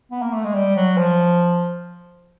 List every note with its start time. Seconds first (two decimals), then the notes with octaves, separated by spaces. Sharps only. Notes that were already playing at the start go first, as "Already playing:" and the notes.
0.11 B3
0.22 A#3
0.33 A3
0.44 G#3
0.55 G3
0.76 F#3
0.97 F3